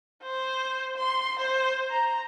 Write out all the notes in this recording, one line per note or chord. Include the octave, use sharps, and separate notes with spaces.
C5
C6
C5
A#5